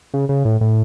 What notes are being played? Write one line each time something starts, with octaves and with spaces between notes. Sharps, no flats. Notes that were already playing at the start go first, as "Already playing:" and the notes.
C#3
C#3
A2
A2